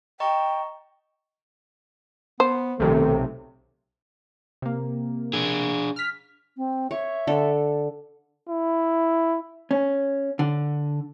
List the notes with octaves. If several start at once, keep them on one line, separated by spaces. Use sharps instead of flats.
D#5 G5 A#5 C#6
B3 C5
B1 C3 D#3 A3
C3 A#3
D4 G#4
F6 B6
C4
C#5 E5
D3 A4
E4
C#4
D3